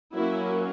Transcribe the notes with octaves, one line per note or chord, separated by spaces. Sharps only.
F#3 A#3 C#4 E4